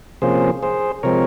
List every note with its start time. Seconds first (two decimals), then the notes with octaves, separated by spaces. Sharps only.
0.22 C3 F3 A#3 C#4 G#4 C5
0.63 G#4 C5
1.03 C3 F3 G#3 C4 A#4 C#5